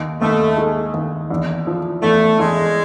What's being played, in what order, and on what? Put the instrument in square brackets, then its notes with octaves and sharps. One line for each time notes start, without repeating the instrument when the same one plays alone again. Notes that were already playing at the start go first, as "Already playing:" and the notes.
Already playing: [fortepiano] D#2
[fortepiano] D#2 [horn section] A3
[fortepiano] G#3
D#2
E2
F3
[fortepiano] E2 [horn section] A3
[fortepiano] E2 [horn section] G#3